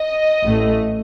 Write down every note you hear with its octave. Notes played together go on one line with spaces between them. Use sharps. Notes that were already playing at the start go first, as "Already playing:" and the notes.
Already playing: D#5
A1 A2 A3